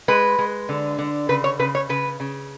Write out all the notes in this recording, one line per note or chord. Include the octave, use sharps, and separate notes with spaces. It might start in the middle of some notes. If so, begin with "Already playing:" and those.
G#3 B4
G#3
D3
D3
C#3 B4
C#5
C#3 B4
C#5
C#3 B4
C#3